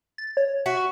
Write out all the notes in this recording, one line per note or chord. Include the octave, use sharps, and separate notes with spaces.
A6
C#5
F#4 E5
C#6